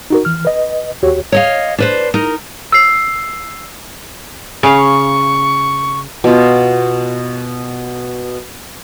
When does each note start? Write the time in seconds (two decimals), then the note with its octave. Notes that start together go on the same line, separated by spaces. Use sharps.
0.10 D#4 F#4 A#4
0.25 E3 F6
0.45 B4 D#5
1.03 D#2 F#4 G4 C#5
1.32 C#5 D#5 F5
1.78 D4 B4 C5
2.14 D#4 A#4
2.72 E6 C7
4.63 C#3 F5 C#6
6.24 B2 F4